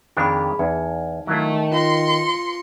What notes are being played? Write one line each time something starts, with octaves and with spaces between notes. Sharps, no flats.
F2 D#3 D4 D#4 G#4 B5
E2 D#4
D#3 F#3 A3 E4 F4
F4 F5 A5 C6 A#6 C#7